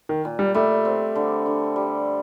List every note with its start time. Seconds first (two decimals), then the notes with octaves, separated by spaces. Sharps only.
0.09 D#3
0.25 A#2
0.39 G3
0.55 G3 A3
0.85 C4
1.15 D3
1.46 D3
1.76 G3